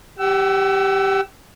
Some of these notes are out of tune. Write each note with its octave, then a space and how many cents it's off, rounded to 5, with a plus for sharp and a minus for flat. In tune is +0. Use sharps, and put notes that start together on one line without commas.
G4 +0 F#5 +40 E6 +10